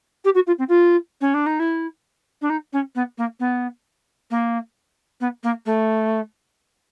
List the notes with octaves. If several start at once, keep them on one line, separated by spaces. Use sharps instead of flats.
G4
F#4
F4
C4
F4
C#4
D4
D#4
E4
D4
D#4
C#4
B3
A#3
B3
A#3
B3
A#3
A3